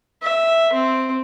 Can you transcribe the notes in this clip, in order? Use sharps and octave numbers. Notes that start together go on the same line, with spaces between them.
E5
C4